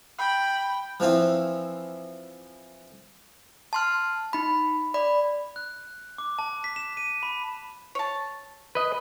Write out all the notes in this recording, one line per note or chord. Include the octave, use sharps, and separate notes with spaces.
G5 B5
E3 F3 C4 E4
A5 C6 F6
D#4 B5
D5 B5
F#6
D6
A5
B6
E7
D#7
B5
C#5 A5
B4 D#5